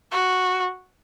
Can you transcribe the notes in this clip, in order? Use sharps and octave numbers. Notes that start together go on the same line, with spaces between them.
F#4